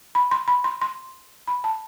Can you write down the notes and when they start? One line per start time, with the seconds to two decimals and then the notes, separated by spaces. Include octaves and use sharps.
0.15 B5
0.31 C6
0.48 B5
0.64 C6
0.82 C6
1.47 B5
1.64 A5